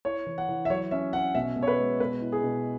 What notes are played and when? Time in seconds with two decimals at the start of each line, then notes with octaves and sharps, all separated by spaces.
0.05 E4 C#5
0.26 E3
0.38 F#5
0.49 E3
0.65 E5
0.70 F#3 C#5
0.91 C#4 E5
1.13 C#4 F#5
1.35 B2 E5
1.56 B2
1.63 C#5
1.67 B4
1.78 G#3
2.00 B2 B4
2.21 E4
2.32 G#4
2.43 B2